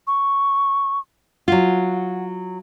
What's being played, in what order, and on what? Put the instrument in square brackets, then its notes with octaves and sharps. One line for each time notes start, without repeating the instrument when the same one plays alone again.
[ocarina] C#6
[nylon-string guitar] F#3 F4 [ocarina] F#5